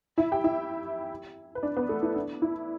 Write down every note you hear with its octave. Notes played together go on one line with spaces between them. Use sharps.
E4 E5
G4 G5
E4 E5
B4
D4 D5
B3 B4
A3 A4
E4
D4
E4